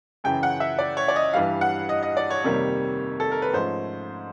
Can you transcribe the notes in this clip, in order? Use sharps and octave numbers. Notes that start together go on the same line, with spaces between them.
F#2 C#3 E3 G5
F#5
E5
D5
C#5
D5
D#5
G2 E3 G3 F5
F#5
D#5
D#5
D5
C#5
F2 C3 D#3 G3 A#3
A4
A#4
B4
G#2 F3 A3 C#4 C5